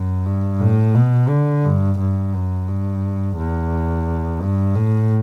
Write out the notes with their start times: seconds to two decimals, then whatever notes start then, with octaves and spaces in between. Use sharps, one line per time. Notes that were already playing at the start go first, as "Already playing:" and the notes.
Already playing: F#2
0.25 G2
0.60 A2
0.95 B2
1.29 D3
1.64 G2
1.99 G2
2.33 F#2
2.68 G2
3.37 E2
4.41 G2
4.76 A2